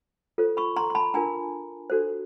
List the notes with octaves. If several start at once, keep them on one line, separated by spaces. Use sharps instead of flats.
F4 A4 C5
B5 C#6
A#5 C6
C6
A5 B5
D4 F4 A#4 G#5 A#5
D4 F#4 A4 C5